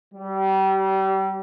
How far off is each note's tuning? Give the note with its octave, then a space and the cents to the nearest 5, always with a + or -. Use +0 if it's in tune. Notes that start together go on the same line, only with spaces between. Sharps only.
G3 -30